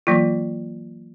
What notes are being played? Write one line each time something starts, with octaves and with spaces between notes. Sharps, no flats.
E3 F#3 A#3 F4